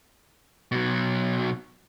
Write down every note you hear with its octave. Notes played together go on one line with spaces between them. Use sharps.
B2 F#3